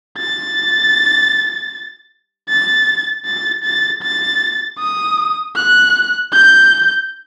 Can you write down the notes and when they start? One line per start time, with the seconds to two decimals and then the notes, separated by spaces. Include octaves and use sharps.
0.18 A6
2.49 A6
3.25 A6
3.64 A6
4.03 A6
4.80 D#6
5.55 F#6
6.33 G6